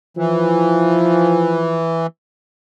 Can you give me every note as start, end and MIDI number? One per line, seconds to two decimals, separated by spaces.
0.17 2.07 52
0.17 1.78 53